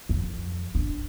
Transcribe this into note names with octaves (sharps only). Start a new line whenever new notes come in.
F2
D4